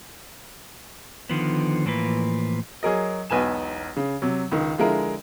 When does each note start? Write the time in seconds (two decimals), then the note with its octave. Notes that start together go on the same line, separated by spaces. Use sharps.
1.29 D3 D#3 F3 B3
1.86 A2 E3 F3 A#3 B4
2.83 F#3 G#4 A#4 D#5
3.30 E1 B1 B4 G#5 E7
3.97 C#3
4.22 C3 F#3
4.52 C#2 D#3
4.78 D3 F3 G#3 E4 A#4